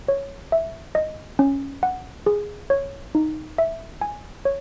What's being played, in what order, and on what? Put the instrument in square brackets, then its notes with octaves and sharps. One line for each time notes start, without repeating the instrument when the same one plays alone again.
[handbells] C#5
E5
D#5
C#4
F#5
G#4
C#5
D#4
E5
G#5
C#5